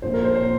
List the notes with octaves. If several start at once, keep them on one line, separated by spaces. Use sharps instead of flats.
A#1 A#2 C5
A#4
C5
C5
A#2